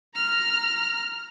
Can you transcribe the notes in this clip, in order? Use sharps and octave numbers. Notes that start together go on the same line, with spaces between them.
A#5 F6